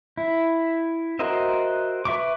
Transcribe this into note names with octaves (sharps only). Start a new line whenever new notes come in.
E4
F#4 A#4 C5 D#5 E5
B4 E5 C#6 D6